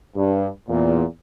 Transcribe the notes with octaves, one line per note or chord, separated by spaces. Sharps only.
G2
E2 A#2